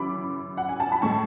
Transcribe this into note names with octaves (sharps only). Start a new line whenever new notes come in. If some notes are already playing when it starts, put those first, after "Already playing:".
Already playing: F#2 C#3 E3 B5 D6
F#5
G#5
A5
B5
A2 G#3 A5 C#6